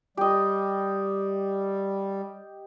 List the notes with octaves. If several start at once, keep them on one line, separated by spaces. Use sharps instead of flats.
G3 G4 D#5